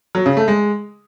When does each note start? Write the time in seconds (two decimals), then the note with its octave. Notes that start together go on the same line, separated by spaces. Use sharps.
0.15 F#3
0.26 C#3
0.37 A3
0.48 G#3